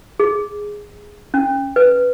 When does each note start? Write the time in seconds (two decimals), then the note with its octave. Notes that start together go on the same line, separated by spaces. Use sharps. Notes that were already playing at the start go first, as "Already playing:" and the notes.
0.20 G#4
1.34 C#4
1.76 B4